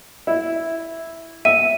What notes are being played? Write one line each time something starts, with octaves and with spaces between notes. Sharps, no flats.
E4
E5 D#7